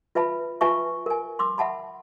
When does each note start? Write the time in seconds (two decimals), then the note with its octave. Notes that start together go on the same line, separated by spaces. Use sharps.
0.15 F4 B4 E5 A5 B5
0.61 F4 B4 E5 G#5 A5 C#6
1.06 A#4 G#5
1.39 C6 D6 E6
1.58 E5 F#5 A5 B5